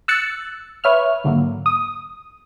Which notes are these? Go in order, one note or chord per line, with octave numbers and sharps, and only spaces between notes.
E6 F#6 A6 C#7
B4 C#5 E5 F6
G#2 D3 F#3 A#3
D#6